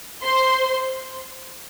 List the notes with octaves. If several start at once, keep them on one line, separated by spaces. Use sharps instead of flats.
C5 C6